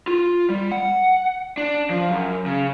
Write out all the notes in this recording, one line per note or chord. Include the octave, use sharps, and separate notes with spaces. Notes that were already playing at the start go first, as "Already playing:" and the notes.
F4
G3
F#5
D4
F3
F#2
C#3